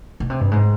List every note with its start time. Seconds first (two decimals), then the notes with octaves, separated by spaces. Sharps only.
0.20 B2
0.30 C3
0.40 G2
0.51 G#2